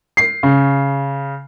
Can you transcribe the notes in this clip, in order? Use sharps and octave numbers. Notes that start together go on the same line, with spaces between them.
C7
C#3